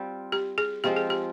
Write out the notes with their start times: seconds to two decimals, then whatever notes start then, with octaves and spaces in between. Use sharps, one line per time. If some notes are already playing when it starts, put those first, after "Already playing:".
Already playing: G3 C4 F4
0.32 G4
0.58 G#4
0.84 F3 G#3 C4 F4 G4
0.97 G#4
1.10 G4